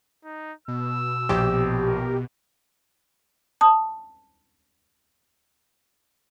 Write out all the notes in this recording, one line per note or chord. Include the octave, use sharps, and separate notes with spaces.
D#4
B2 E6
A#1 G4
A#4
A5 D#6